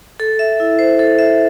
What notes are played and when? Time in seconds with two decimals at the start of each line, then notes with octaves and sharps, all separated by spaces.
0.20 A4
0.39 E5
0.60 E4
0.79 C5
0.99 A4
1.19 E5